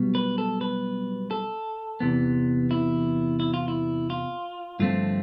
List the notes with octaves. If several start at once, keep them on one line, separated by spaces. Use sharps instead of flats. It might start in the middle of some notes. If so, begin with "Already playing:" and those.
Already playing: B1 B2 G3 B3
B4
A4
B4
A4
E2 C3 E3 B3
E4
E4
F4
E4
F4
G2 D3 F3 A3 C4 F4